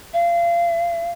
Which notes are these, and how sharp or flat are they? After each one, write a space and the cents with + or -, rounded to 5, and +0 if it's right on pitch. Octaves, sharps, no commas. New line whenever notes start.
F5 -30